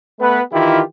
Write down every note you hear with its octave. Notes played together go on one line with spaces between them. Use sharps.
A3 B3 B4
D#3 E3 E4 F4 G4